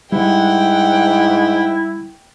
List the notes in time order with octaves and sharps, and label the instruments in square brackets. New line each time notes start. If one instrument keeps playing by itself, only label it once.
[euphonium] G#2 [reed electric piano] G3 [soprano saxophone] E4 [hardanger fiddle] F#5 G5